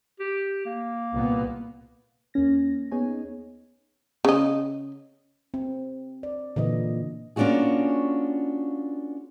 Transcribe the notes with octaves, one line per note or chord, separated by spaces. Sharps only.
G4
A#3
C2 A#2 B3
D#2 A#3 C#4 A#6
B3 D#4 G#4 C#5 G#5
C#3 D#5
C4
D5
A#2 D3 E3 D#5
A#3 C#4 D4 F4 F#4 G#4